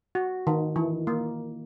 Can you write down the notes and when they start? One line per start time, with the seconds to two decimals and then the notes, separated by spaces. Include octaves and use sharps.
0.15 F#4
0.47 D#3
0.76 E3
1.07 A#3